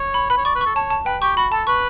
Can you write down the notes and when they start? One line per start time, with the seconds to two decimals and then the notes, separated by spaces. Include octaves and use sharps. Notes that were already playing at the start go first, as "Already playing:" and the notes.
Already playing: C#5
0.14 B5
0.30 B4 B5
0.37 C#5
0.45 D5 C#6
0.55 B4
0.61 A4 C#6
0.75 C#5 A5
0.90 A5
1.06 B4 G5
1.21 G4 C#6
1.37 F#4 B5
1.52 A4 A5
1.67 B4 C#6